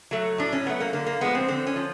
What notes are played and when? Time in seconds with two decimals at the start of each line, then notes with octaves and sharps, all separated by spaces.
0.11 F#3 A3
0.38 A2 D4
0.52 C#4
0.66 F#3 A3 B3
0.80 A#3
0.93 D3 A#3
1.07 A#3
1.21 F3 G#3 B3
1.35 C4
1.48 D3 C4
1.67 C#4
1.76 F3